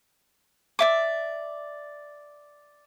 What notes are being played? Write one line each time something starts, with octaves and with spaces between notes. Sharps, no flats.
D5 E5 D6